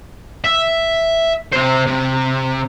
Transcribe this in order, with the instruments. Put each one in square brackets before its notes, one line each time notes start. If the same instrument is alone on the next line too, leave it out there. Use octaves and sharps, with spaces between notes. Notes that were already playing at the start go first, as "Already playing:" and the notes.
[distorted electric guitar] E5
C3 C5
C3